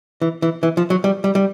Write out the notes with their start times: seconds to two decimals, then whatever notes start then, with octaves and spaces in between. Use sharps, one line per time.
0.22 E3
0.42 E3
0.63 E3
0.77 F3
0.90 F#3
1.04 G3
1.24 G3
1.35 G3